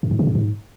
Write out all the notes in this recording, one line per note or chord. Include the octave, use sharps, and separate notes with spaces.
F#2
G2
C#3
F#2
G#2